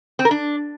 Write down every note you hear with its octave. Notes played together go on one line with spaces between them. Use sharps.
C4
A#4
D4